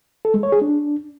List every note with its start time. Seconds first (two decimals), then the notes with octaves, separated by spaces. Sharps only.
0.25 A4
0.34 G#3
0.43 C#5
0.52 G#4
0.62 D4